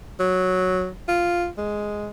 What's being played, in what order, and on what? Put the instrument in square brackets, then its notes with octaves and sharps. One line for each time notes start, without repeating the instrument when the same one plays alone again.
[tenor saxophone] F#3
F4
G#3